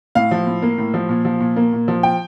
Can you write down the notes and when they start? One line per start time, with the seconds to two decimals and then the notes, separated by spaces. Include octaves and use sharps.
0.15 A2 F5
0.31 F3
0.47 A2
0.62 A#3
0.78 A2
0.94 F3
1.09 A#2
1.25 F3
1.40 A#2
1.56 A#3
1.73 A#2
1.88 F3
2.03 G5